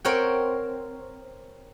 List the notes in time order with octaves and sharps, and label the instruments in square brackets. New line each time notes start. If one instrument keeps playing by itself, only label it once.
[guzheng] C4 A#4 C#5 F#5 G5